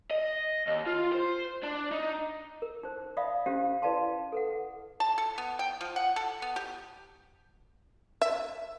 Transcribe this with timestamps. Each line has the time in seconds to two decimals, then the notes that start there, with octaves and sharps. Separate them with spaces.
0.11 D#5
0.67 D#2
0.87 F4
1.12 C5
1.63 D4
1.92 D#4
2.62 A#4
2.83 D#4 C5
3.17 D5 E5 F5 B5 D#6
3.46 C#4 D4 G4 C5 E5 F5
3.82 E4 B4 D5 F5 A5 C6
4.32 A4 B4 F#5
5.00 A5
5.18 A4
5.38 B3
5.59 G5
5.81 F3
5.96 F#5
6.16 A4
6.42 B3
6.56 G4
8.22 E5